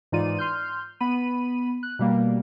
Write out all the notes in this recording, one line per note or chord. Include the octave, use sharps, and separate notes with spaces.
G#2 E3 D#4 F4 D5 D#7
C6 F6 G6
B3 B5 D#7
F#6
B2 G3 A#3